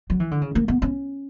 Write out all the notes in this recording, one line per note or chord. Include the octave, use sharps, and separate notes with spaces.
F#3
E3
D3
C#3
A#3
B3
C#4